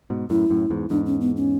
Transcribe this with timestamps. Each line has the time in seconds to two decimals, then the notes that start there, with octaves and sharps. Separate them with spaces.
0.10 G#2 B2
0.30 F#2 A2 E4
0.50 F#2 A2
0.70 E2 G#2
0.90 E2 G#2 D4
1.06 C#4
1.21 B3
1.36 C#4